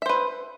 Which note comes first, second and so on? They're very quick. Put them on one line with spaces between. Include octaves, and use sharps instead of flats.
E5 C5 B4